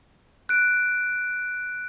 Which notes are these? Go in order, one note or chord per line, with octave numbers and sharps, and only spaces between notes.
F#6 D7